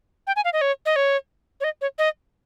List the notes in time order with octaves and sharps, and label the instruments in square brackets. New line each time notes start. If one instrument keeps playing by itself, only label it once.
[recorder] G5
G#5
F5
D#5
C#5
D#5
C#5
C#5
D#5
C#5
D#5